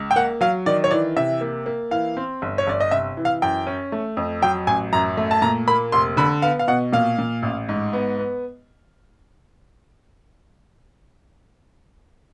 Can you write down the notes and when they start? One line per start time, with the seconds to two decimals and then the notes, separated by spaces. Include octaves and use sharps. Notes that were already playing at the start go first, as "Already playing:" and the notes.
Already playing: C#2
0.11 G5
0.16 A#3 F#5
0.41 F#3 F5
0.66 D#3 D5
0.84 C#5
0.91 E3 D5
1.16 C3 E5
1.41 A#3
1.66 A#3
1.91 E3 F5
2.17 C4
2.42 G1
2.58 C#5
2.67 G1 D5
2.80 D#5
2.91 C3 E5
3.17 E3
3.25 F5
3.42 F#2 G5
3.67 C#4
3.92 A3
4.17 F2
4.42 F#3 G5
4.67 A1 G#5
4.93 F#2 A#5
5.17 A3
5.31 A5
5.42 A#2 A#5
5.67 A#3 B5
5.92 F1 C6
6.17 D3 B5
6.42 B3 F5
6.59 F5
6.68 B2 F#5
6.93 A#2 F5
7.19 A#2
7.43 A1
7.69 G#2
7.93 B3
8.18 B3